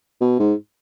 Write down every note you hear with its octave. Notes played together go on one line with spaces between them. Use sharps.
B2
G#2